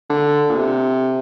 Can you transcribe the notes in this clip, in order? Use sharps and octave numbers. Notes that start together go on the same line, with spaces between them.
D3
A#2
C3